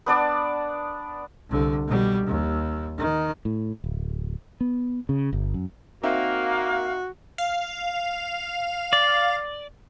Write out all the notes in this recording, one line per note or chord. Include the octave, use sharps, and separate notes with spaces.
B3 D4 D5 A5
C2 D3
B2 G3
D#2
D#3
A2
D1
B3
C#3
G1
F#2
A#3 C4 D#4 F#4 E5 F5
F5
D5